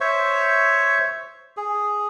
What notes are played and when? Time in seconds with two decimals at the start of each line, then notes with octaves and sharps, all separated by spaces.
0.01 C5 C#5 E5 C#6
1.57 G#4